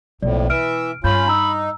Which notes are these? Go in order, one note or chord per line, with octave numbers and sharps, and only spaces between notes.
B1 F2 A2 A#3 D5
B2 E3 E5 F6 D7
G2 C#4 F4 B5 G6
D#4 A#5 E6